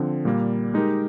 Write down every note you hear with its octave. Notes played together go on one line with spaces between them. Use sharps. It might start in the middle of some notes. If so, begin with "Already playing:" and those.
Already playing: D3 F3 C4
A#2 G3 A#3
G#3 D#4 G4 A#4